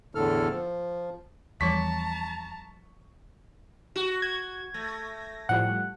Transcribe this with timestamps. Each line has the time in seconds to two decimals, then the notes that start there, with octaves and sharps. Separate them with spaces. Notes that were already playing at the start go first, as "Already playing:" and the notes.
0.15 E2 A2 D3 A4 F6
0.51 F3
1.61 E2 F3 G3 C#5 A5 A#5 C#6 B6
3.96 F#4
4.22 G#6
4.74 A3 A#6
5.49 A2 F3 G3 F#5